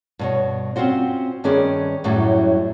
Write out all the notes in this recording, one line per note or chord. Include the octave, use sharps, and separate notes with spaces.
G2 B2 C#5
C4 C#4 F4 F#4 C5
G2 D#3 C#4 G#4 B4 D5
F#2 A2 F#3 G3